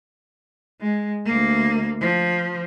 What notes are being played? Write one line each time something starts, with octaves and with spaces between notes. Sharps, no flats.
G#3
D2 A#3
F3